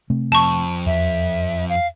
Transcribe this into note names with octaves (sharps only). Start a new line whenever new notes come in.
C3 A3 C4
F2 A5 C#6
E2 E5
F5